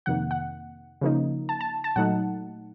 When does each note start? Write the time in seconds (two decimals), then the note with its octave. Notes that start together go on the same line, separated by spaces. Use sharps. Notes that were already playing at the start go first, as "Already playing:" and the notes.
0.06 F2 C3 D#3 A#3 F#5
0.31 F#5
1.01 C#3 F3 A#3 D#4
1.49 A5
1.61 A5
1.84 A5
1.96 A#2 F#3 A3 D#4 F#5